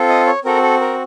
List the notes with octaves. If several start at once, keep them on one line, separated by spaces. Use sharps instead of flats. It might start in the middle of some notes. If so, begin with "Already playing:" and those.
Already playing: C4 F4 A4
D#5
C#5
C4 F#4 A4 A#4
A4
A#4